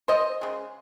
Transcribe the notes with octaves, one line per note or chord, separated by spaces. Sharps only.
C5 D#5
C#3 G#3